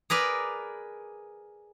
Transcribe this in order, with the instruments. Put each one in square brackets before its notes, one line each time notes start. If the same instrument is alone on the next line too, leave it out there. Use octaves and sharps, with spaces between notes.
[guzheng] G#4 A#4 B4 D5